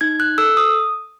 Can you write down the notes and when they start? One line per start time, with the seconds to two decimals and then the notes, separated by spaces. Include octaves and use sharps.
0.01 D#4 G#6
0.20 F#6
0.38 A4 E6
0.57 D#6